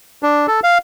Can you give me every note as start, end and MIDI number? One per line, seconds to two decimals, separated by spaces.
0.23 0.47 62
0.47 0.60 69
0.64 0.78 77